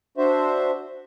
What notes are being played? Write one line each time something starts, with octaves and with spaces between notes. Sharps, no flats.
D4 F#4 C5 E5